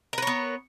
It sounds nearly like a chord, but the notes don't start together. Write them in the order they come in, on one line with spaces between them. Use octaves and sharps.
A#4 B4 C#5 B3